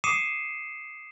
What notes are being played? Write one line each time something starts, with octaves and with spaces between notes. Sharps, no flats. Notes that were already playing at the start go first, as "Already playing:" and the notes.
D6 D#6 C7 C#7 D#7 E7